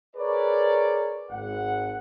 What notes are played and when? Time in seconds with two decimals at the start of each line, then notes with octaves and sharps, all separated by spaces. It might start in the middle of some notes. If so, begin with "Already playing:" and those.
0.16 G#4 A#4 B4 C#5 D5
1.31 G#1 F#5